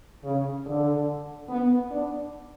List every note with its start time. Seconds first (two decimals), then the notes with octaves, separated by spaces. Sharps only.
0.25 C#3
0.66 D3
1.50 B3
1.91 D4